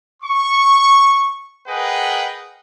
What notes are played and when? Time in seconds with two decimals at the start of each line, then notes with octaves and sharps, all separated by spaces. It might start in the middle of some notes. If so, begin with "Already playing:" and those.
0.23 C#6
1.67 G#4 A#4 B4 D#5 F#5 G5